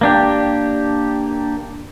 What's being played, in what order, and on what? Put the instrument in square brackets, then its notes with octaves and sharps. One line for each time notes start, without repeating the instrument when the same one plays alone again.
[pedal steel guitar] A#3 D4 G4